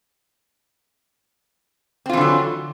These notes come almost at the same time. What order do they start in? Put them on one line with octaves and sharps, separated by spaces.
C4 F4 E3 D3 F#3